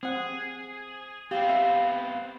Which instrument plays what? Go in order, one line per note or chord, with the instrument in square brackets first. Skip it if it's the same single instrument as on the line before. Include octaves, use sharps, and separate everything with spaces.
[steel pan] C4 F#5 [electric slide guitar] G#4
[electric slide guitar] B3 C4 [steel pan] G4 [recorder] F5
[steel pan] E5